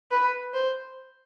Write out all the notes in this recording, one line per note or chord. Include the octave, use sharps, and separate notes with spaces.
B4
C5